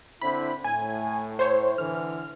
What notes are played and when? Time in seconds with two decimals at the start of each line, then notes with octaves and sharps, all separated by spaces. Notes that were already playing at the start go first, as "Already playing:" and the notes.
0.22 D3 C4 E4 B5
0.64 A2 G#5
1.39 C5 C#5
1.78 D3 E3 F6